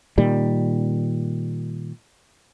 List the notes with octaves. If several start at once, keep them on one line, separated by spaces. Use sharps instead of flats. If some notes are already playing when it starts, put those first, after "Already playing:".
A#2 D#3 G3